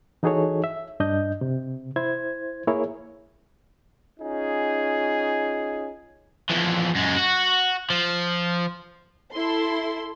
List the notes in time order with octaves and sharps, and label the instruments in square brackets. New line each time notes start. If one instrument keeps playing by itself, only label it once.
[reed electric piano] E3 D#4 F#4 G#4 A4 C#5
E5
G2 D4 D#5 G6
C3
E4 C5 G#6
A#3 E4 G#4 A#4 C#5
[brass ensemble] C#4 D#4 F4 G#4
[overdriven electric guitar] F2 E3
F#2 G#3
F#4
F3
[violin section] E4 A4 C6